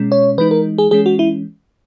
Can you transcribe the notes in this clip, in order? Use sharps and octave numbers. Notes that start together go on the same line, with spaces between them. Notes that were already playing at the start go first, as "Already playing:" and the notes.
Already playing: B2 G#3 C#4
C#5
E3 G#3 D#4 B4
A#4
G#4
E3 G#3 C#4 G#4
F#4
E4